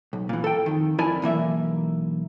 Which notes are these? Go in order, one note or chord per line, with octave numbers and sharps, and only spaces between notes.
B1
A#2 E3
A4 G5
F2 D#3
F2 E4 A#4 D5 G#5 A5
B1 E3 A#3 E5